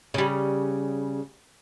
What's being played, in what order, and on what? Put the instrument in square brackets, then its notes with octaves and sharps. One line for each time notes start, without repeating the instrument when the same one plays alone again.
[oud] C#3 G3